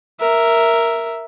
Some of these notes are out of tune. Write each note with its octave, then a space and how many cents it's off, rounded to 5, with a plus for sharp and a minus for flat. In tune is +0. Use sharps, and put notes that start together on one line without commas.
A#4 +0 E5 +0